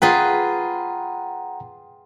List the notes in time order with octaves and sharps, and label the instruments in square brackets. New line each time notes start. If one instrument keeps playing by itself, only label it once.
[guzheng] F4 G#4 B4 [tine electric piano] F#5 G5 A#5